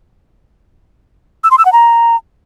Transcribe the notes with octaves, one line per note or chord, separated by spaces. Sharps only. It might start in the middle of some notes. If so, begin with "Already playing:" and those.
E6
C6
E6
F#5
A#5